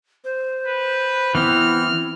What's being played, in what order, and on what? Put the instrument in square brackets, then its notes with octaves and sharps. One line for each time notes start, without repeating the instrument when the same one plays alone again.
[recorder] C5
[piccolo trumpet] B4
[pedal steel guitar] E3 B3 C4 [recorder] E4 [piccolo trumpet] F6